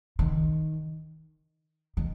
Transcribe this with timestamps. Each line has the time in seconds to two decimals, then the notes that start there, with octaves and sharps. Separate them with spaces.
0.19 D#3
1.97 D#3